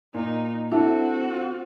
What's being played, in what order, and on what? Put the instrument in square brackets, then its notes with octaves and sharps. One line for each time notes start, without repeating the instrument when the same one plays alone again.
[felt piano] A#2 [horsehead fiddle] D#4
[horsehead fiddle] C4 F#4 [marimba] D4 [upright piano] E4 [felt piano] A4 F#5